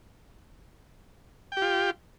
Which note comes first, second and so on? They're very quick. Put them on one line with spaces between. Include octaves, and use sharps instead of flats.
G5 G4 F4